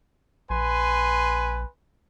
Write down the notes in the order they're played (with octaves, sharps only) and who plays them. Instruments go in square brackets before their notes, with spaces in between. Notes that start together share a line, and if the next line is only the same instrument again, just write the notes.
[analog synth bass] A#1 [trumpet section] B4 G#5 C6